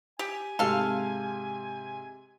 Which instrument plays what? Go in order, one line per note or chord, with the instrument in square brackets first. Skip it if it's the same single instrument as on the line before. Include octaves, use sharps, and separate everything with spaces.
[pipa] G4 [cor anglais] G#5
[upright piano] G#2 C3 [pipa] A4 F5